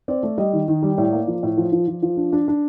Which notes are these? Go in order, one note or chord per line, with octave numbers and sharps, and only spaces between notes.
C4 D5
A3
G3 D#5
D#3
D#3
G3
A2 D5
A#3
F3
A2
F3
F3
F3
F3
D4
D4
D4